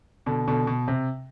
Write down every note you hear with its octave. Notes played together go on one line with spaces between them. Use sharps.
B2 D3
B2 D3
B2
C3